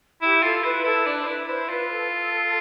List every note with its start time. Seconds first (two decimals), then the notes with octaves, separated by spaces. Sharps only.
0.22 E4 G4
0.43 F4 A4
0.64 E4 B4
0.84 E4 A4
1.06 D4 B4
1.21 C5
1.27 E4 B4
1.48 E4 C5
1.69 F4 B4
1.86 B4
1.91 A4